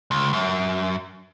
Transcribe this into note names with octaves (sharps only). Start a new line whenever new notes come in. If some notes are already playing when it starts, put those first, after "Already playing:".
C#2
F#2